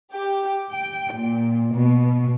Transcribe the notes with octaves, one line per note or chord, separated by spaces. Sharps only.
G4
G5
A#2
B2